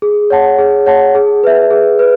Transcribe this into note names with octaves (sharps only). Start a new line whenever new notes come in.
G#4
C#5 F#5 A5
G#4
C#5 F#5 A5
G#4
B4 E5
G#4
B4